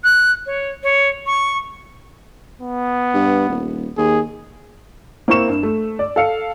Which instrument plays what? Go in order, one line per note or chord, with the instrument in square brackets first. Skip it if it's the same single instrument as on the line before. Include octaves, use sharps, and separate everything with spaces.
[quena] F#6
C#5
C#5
C#6
[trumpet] B3
[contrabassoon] G2
D#1
[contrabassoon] D#2 [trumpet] G#4
[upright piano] A#3 C4 E4 A#4 C#6 E7
G2
A3
D5
A4 F5 C#7